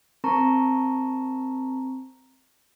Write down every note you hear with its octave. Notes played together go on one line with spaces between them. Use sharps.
C4 A#4 A5 A#5 C#6